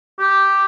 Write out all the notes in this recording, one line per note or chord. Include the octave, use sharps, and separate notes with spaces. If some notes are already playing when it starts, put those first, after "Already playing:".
G4